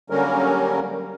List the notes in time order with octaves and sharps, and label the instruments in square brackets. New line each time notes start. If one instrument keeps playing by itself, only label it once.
[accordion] D3 F#3 G3 A#3 C#4 A#4